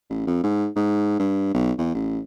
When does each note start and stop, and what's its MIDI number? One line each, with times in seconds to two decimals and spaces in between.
0.10 0.24 33
0.27 0.40 41
0.44 0.68 44
0.76 1.17 44
1.19 1.52 43
1.54 1.72 35
1.78 1.92 40
1.94 2.19 33